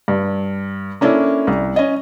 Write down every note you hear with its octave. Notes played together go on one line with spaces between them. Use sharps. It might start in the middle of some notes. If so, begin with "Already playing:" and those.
G2
A#3 C#4 D4 E4 A4
C2
C#4 D#5